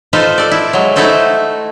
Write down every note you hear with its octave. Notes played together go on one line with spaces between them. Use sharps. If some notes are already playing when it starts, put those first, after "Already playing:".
D#4 F4 A4 B4 C5
A4 D5
E4
F#3 G#3
A3 D#4 E4 F#4 A4 C5